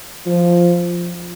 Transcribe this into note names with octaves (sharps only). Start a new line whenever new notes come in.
F3